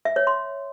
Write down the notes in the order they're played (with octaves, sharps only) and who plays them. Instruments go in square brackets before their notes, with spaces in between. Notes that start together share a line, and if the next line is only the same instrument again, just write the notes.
[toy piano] E5
C#5
C6